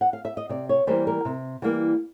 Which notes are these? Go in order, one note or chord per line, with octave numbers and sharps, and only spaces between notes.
F#5
F5
E5
D#5
C3 D5
C#5
E3 G3 A#3 C5
A#4
C3
E3 G3 A#3